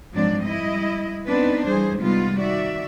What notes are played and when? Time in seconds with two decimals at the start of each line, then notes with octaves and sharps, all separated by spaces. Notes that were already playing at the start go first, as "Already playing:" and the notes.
0.14 G#2 F3 F#3 C4 D4 D5
0.44 G3 E4 D#5
1.28 B3 C4 D4 D#4 B4
1.67 E3 G3 G#4 C5
2.01 C3 D#3 G3 G#3 B3 F4
2.37 D#3 F#4 D5 E5